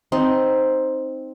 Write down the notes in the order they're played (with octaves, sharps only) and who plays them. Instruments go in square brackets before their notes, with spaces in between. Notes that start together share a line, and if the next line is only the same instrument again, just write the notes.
[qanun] C4 D#4